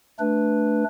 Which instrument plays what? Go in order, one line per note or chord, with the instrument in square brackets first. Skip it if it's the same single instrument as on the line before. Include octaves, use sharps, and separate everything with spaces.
[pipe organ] A3 D4 B4